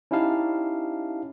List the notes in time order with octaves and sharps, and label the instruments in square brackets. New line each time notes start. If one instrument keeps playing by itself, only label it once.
[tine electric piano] C#4 D#4 E4 G4 F5 A5